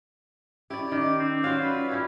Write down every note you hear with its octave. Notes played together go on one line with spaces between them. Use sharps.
C#4 E4 G4 D5
D#3 D6
C4
F#3 F4 D5 F5
B4
C#4 E4 G4